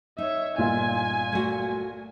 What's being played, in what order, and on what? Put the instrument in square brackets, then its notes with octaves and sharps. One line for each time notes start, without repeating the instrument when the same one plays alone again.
[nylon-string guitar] D#4 [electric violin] C#5 E5
[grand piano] G1 A#2 F4 [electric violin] G#5
[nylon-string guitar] A3 F#4